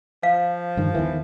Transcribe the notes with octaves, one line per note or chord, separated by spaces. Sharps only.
F3 F5
G2 D#3
E2 D#3 E3